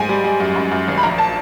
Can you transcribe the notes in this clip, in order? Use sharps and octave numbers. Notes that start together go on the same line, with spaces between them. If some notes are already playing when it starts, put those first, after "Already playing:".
Already playing: G#2 G#5
G3
G3
F#2
F#2
F#2
G#1
B5
A#1 A#5
A5